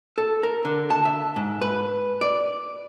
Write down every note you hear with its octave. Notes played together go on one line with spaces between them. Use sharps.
A4
A#4
D3
A5
E5
G#2
B4
D5